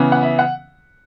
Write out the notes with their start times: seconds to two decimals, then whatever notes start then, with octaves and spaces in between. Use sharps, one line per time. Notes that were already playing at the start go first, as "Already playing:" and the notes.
Already playing: C#3 E3 B3
0.12 F#5
0.23 E5
0.39 F#5